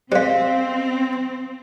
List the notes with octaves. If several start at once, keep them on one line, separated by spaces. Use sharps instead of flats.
G3 G#3 C4 C5 F5